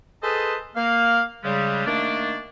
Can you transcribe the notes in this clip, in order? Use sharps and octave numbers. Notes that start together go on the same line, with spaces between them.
G#4 A4 B4 C5 D#5 A5
A#3 F5
C#3 G3 G#3
D#3 A3 A#3 D4